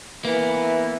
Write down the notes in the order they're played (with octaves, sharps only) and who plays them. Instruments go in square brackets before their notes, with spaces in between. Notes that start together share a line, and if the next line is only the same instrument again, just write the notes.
[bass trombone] E3 [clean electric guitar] A#3 B3 [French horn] B4